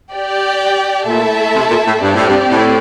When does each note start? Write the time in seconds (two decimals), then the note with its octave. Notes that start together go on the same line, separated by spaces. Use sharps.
0.12 G4 D5 G5
1.07 A#2 A3 E4 A4 E5 A5
1.56 C3
1.71 A#2
1.87 A2
2.02 G2 C4 G4 D5
2.16 A2
2.29 G2
2.51 A2